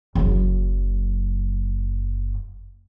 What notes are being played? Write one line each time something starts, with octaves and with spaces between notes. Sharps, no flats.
F#1 F#2